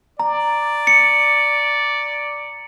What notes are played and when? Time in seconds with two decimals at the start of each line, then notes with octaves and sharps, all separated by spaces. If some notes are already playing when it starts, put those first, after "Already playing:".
0.20 D5 A#5
0.87 C#7